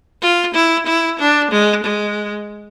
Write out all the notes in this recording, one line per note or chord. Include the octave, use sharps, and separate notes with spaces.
F4
E4
E4
D4
G#3
G#3